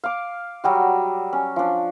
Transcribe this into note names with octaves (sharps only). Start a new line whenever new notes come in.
F5 D6
F#3 G3 F#4
C#4
F3 D4